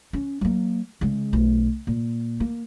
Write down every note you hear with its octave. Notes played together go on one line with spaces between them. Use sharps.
C#4
F#3 A#3
C#3 G#3
B1 A3
A#2
A#3